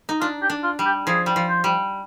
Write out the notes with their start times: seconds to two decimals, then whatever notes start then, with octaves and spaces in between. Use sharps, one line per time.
0.09 D#4
0.20 D4 F4
0.42 G4
0.50 D4
0.63 F4
0.79 G3
0.85 G4
1.07 F3 G#4
1.26 G3
1.36 F3
1.49 C5
1.64 G3